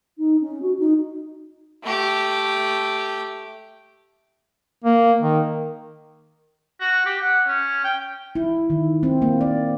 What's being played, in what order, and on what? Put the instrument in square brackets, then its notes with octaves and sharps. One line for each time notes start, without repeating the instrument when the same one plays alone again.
[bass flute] D#4
C#4
F#4
D#4
[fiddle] A3 G4
[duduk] A#3
D#3
[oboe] F#4
G4
F#5
C#4
G5
[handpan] E4
D#3
C4
A#3
D5